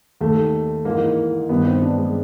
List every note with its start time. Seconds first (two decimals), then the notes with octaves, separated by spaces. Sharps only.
0.21 D#2 D#3 A3
0.85 G#2 E3 A#3
1.49 G2 D#3 B3
1.66 C4
1.82 D4
1.98 G#3